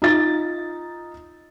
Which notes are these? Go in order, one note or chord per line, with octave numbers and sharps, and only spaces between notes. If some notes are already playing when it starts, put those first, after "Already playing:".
D#4 F4 A6